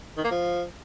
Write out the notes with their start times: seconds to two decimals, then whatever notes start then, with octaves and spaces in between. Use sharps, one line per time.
0.18 D#3
0.24 A#3
0.31 F3